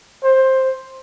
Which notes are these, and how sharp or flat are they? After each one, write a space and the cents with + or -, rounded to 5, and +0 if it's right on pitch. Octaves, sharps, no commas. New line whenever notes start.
C5 +10